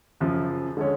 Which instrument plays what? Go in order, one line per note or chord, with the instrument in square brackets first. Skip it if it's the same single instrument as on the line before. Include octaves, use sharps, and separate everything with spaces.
[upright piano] F#2 C#3 F3
D3 G#3 C#4